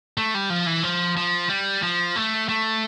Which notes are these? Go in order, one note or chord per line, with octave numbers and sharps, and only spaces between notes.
A3
G3
F3
E3
F3
F3
G3
F3
A3
A3